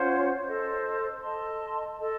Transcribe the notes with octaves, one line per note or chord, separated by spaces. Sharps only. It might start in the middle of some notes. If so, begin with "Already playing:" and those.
Already playing: C#4 F4 C5 F#5
A4 C5 D#5
A4 D#5 A5 C6
A4 D#5